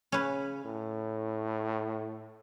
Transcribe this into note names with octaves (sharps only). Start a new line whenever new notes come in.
C#3 C#4 B4
A2